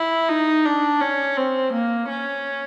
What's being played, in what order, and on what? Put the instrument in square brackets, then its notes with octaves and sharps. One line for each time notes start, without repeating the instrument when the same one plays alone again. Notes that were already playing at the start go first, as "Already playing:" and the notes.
Already playing: [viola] E4
D#4
D4
C#4
C4
A#3
C#4